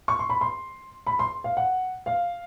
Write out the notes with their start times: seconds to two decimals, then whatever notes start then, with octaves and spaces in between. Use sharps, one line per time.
0.08 C#6
0.19 C6
0.30 B5
0.41 C6
1.07 B5
1.19 C6
1.44 F5
1.57 F#5
2.06 F5